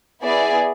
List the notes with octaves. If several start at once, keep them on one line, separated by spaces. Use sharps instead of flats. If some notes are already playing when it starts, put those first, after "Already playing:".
B3 E4 G#4 D5